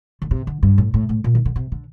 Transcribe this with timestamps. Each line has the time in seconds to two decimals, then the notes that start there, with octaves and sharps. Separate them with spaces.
0.22 D3
0.31 C3
0.47 D3
0.63 G2
0.78 A2
0.94 A2
1.09 A2
1.24 A#2
1.35 D#3
1.45 D3
1.56 C3
1.72 D3